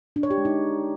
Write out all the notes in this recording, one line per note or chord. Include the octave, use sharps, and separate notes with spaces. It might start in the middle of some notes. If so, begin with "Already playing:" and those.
D4
C#5
G4
G#3
D#4